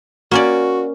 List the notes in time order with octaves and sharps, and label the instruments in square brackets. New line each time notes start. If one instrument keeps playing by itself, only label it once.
[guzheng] A#3 C#4 D5 [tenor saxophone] F#4